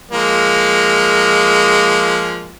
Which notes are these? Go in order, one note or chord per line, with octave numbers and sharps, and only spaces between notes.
F3 G#3 A#3